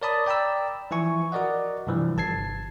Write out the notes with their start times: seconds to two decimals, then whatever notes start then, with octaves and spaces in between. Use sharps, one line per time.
0.02 A#4 C#5 D5 A5 B5 D#6
0.26 D5 G5 A#5 B5 E6
0.91 E3 F3 E4 G#5 C#6
1.32 F#4 A#4 D5 D#5 F#5
1.87 G2 C3 E3 F3 G3
2.17 G1 A5 G#6 C7